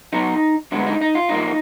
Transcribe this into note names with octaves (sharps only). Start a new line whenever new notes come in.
B1 B2 F#3 D#4
F#2 D3 G#3 B3 D4
D#4
D#4
F4
B1 A#2 F3 A#3 D#4